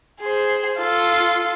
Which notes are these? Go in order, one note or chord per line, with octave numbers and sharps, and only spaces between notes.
G#4 C5
F4 A4